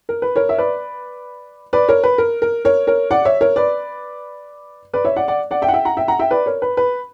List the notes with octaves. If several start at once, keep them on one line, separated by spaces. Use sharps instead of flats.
A#4
B4
A#4 C#5
E5
B4 D5
B4 D5
A#4 C#5
B4
A#4
A#4
A#4 C#5
A#4 C#5
D5 F#5
C#5 E5
A#4 C#5
B4 D5
B4 D5
C#5 E5
D5 F#5
D5 F#5
D5 F#5
E5 G5
F#5
E5 G5
F#5 A#5
E5 G5
F#5 A#5
E5 G5
B4 D5
A#4 C#5
B4
B4